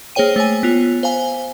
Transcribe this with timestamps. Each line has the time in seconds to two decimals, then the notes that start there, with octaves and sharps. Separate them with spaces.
0.15 A#3 G#4 C5 C#5 G5 D#7
0.36 A3 C#5 G#5
0.63 B3 F4
1.03 C5 F5 G#5